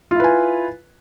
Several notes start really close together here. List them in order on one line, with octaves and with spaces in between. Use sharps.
F4 E4 B4 G#5